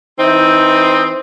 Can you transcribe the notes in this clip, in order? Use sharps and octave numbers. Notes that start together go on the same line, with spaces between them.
E3 C4 D#4 E4